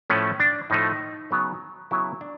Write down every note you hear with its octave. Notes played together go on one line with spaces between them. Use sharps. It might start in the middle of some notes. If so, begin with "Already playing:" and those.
A2 F3 A3 C#4
D4
A2 F3 A3 D#4
C#3 F#3 B3
C#3 F#3 B3 E4
D4